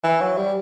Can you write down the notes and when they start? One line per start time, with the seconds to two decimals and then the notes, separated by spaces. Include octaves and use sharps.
0.04 E3
0.21 F#3
0.37 G3